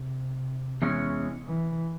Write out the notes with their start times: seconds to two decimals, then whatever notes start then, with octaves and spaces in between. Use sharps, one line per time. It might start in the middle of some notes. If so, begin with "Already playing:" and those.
Already playing: C3
0.82 E2 E3 G#3 C#4
1.47 E3